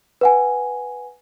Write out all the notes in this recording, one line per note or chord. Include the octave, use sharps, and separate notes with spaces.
B4 F#5 G#5